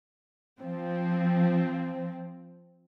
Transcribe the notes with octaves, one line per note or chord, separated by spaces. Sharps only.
F3 C4